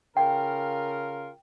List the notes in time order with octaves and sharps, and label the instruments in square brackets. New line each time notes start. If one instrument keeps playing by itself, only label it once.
[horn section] C#3 F4 A#4 [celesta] G5